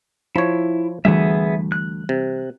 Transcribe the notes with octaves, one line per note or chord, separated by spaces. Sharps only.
F3 E4 C#5
D2 E3 G3 B3 G#4 E5
F#6
C3